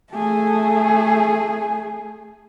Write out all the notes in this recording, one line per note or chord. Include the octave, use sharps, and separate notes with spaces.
A3 G#4